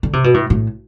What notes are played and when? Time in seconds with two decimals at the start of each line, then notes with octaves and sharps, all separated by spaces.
0.03 D3
0.13 C3
0.24 B2
0.34 A2
0.50 A2